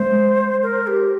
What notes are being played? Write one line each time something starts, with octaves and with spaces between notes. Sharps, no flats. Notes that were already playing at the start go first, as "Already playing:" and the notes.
Already playing: G#3 C5
A#4
G4